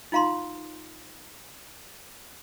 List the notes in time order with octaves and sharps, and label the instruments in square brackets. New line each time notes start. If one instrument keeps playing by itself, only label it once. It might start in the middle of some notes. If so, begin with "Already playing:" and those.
[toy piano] D#4 F4 F5 A#5 C6